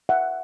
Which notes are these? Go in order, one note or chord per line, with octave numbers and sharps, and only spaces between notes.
E5 F#5